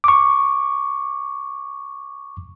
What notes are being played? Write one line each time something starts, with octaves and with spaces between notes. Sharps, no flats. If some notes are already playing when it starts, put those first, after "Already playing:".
C#6 D6